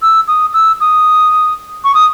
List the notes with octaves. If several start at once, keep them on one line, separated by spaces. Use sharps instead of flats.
E6
D#6
E6
D#6
C#6
D#6